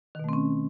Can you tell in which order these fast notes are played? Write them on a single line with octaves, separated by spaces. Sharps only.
D#3 B2 A3 C4 C#4